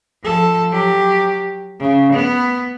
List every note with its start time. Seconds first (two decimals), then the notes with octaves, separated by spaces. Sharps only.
0.23 F3 A4
0.70 F#3 G4
1.80 C#3
2.13 B3